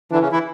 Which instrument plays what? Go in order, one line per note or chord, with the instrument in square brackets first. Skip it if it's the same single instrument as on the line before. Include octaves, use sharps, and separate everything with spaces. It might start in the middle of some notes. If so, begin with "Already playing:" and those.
[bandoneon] D3 D4 [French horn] E3
[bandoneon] C#3 C#4
E3 E4